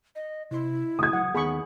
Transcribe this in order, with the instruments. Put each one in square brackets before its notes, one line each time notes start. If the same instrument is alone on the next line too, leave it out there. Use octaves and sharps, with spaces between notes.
[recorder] D#5
[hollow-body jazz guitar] C3 C6 [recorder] E4
[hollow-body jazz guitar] C#3 A3 F#4 [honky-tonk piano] D#6 G#6
[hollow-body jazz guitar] F#3 [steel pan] F#5
[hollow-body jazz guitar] D#2 D#3 B3 [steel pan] G#4 B5 C#6